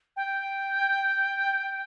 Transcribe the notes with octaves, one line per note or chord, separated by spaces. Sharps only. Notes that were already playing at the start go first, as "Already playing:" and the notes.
G5